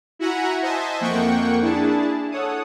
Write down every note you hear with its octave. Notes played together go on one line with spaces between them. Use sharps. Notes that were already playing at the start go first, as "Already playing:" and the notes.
E4 F#4 E5 F#5 G#5 A#5
C5 D#5 E5 G#5 A5
F2 A#3 F#5 G5 C#6
D4 E4 G#4 A5
A4 C#5 F#5 D#6